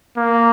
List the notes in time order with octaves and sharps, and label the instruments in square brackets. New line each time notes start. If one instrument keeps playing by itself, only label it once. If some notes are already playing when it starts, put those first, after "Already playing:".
[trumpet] A#3